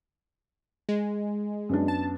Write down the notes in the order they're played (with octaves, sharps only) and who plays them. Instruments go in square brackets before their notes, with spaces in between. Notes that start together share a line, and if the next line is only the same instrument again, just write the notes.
[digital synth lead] G#3
[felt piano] F#2 B3 D4
[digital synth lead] A5